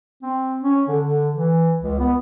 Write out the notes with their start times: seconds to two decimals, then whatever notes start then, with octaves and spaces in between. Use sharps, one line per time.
0.22 C4
0.62 C#4
0.88 D3
1.04 D3
1.32 E3
1.81 C#2
1.99 B3